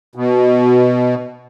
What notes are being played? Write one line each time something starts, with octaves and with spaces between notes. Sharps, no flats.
B2